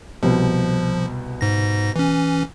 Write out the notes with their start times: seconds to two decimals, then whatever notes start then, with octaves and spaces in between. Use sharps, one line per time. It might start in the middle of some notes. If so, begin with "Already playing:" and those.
0.23 C2 B2 F3
1.41 G#2 A#6
1.96 E3 C#4